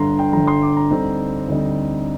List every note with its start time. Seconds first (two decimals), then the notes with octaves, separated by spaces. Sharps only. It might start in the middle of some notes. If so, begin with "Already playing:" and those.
Already playing: G1 G2 D3 A#5 C6
0.19 G5
0.33 G1 G2 D3 A#5
0.47 C6
0.62 D6
0.77 A#5
0.91 D2 D3 G3 C4 D#4
1.48 D2 D3 G3 C4 D#4